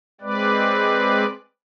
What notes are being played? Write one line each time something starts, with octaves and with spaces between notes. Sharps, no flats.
G#3 C4 B4 D5